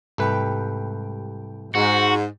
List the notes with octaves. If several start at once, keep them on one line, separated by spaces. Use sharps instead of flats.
C2 G#2 A3 G4 B4 G5
G#2 F#4